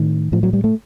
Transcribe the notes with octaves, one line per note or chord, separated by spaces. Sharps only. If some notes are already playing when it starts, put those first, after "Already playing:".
Already playing: A2 D#3
A2 F3
F#3
G3
A3